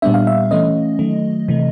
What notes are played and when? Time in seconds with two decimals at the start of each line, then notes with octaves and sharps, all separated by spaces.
0.02 A#2 G3 B3 D4 E5
0.14 F5
0.27 E5
0.51 E3 A3 C#4 D#5
0.99 D#3 F#3 A3
1.48 C3 E3 A3